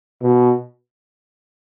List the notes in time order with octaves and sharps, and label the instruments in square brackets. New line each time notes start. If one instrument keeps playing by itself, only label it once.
[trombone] B2